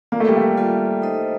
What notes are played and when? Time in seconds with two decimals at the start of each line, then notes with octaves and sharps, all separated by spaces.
0.12 A#3 F4 A4 D5 F5
0.20 A3
0.29 G3
0.37 A3
0.57 G3 A#3 F4 A4 D5
1.02 D#4 A4 C5 D#5